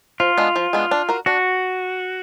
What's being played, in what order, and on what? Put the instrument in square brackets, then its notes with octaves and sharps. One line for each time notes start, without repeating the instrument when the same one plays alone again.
[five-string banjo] F3 [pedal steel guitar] F4
[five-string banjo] G#3 B3 D4
F3
G#3 B3 D4
D4
F#4 A#4
[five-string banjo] D4 [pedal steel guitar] F#4